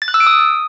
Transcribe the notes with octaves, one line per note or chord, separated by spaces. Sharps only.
A6
F#6
E6
D7
D#6